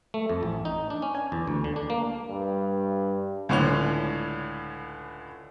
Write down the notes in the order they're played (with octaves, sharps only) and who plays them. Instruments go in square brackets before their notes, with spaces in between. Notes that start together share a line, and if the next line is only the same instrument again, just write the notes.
[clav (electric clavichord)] A3
F2
A1
D#4
D4
C#4
G#5
E2
D2
D3
D4
A#3
[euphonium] G2
[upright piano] C#2 A2 D3 C#4 F7